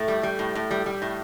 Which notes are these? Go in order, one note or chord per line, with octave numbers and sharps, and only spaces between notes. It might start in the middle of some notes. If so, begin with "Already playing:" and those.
Already playing: A2 A3
G3
G3
A2
A2
G3
G3
A2